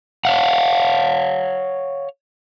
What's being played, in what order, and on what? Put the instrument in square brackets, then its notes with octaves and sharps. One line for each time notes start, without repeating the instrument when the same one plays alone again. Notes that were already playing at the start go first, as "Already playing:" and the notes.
[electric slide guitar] C#5 F5 F#5